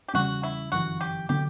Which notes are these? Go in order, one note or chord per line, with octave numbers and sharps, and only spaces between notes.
G4
E2 C#3 G3 C#4 F#4
E4
G1 F#2 C#3 E3 F#4
G4
D3 F#3 B3 G4